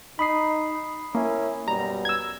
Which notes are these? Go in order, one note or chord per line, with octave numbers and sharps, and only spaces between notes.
D#4 B5 D#6 C7
A#3 C#4 E4 A#4
F#2 B2 G3 A#5
E6 G#6